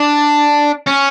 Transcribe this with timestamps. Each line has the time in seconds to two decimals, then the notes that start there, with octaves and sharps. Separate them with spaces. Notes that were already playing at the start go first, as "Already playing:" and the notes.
Already playing: D4
0.87 C#4